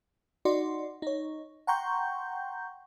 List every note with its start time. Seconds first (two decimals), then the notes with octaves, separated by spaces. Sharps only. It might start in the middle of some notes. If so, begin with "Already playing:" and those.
0.45 D#4 F#4 D5 C6
1.02 D#4 C#5
1.67 F#5 G5 A#5 C6 C#6 G6